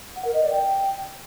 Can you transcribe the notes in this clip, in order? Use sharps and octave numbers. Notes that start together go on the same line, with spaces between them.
F#5
A#4
D#5
D5
G5